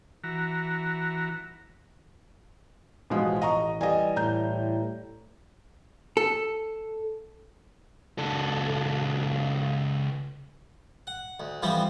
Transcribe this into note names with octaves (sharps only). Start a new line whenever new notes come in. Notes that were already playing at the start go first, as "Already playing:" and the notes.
E3 F#4 A#5
A1 B2 F3 G#3
D#5 A#5 C#6
E3 G3 D#5 G#5
A2 A#5 G6
A4
C#2 A4
F#5
D2
E3 F3 G3 B3 C4